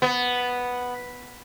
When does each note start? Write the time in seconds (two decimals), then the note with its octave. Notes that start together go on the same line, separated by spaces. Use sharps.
0.02 B3